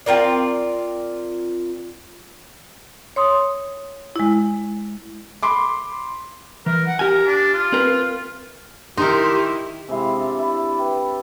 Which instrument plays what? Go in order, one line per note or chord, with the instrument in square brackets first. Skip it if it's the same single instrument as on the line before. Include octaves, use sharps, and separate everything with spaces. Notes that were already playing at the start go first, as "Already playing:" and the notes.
[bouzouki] C4 F4 A#4 D5
[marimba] C#5 C6 D#6
G#3 E4
[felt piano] B5 C6 D6
[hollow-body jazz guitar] E3 [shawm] A#4
[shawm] F#5
[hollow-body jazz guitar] G4 G#5 [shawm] A#4
[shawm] D4
F4
[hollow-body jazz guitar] C4 A#4 B4
[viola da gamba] D#3 E4 [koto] D#4 A#4 [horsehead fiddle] G4 [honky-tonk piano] C6
[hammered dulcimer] C3 G#3 E4 F5
D4
E4 D5
B4 G5